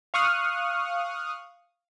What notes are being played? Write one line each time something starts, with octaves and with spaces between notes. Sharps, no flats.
F5 C#6 D#6 F6 F#6